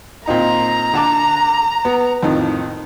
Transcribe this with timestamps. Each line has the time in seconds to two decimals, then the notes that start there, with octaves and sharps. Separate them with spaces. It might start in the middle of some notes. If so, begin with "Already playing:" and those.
0.27 A#2 C4 D#4 A#5
0.94 D3 A5 D6
1.85 B3
2.23 F2 A2 D#3